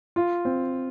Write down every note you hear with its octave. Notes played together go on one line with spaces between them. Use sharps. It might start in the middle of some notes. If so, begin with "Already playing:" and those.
F4
C4